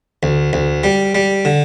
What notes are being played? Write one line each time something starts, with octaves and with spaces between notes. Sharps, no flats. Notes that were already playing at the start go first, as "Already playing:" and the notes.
D2
D2
G3
G3
D3